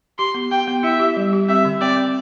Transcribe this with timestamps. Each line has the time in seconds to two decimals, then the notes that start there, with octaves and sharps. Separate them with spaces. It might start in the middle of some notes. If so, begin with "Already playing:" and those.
0.19 G4 C6
0.34 B3
0.51 G4 G5
0.67 B3
0.83 E4 E5
0.99 G4
1.17 G3
1.33 G4
1.48 C4 E5
1.65 D3
1.81 C4 D5
1.97 C4